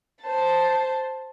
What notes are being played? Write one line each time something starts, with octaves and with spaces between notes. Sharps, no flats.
C5 A5